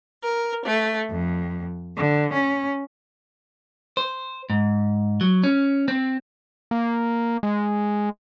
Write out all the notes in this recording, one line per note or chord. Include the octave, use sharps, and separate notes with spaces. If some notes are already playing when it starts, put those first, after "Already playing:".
A#4
A3
F2
D3
C#4
C5
G#2
F#3
C#4
C4
A#3
G#3